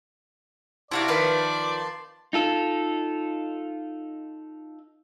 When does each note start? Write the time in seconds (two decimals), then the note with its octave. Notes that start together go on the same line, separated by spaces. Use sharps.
0.91 C3 E4 F#4 D5 F5 A5 C6
1.08 D#3 F3 A#4 B4 F5
2.33 D#4 F4 A4